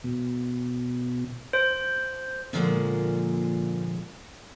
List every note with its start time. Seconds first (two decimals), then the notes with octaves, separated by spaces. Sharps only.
0.04 B2
1.53 C5
2.53 A#2 D3 F3 F#3 G#3 A#3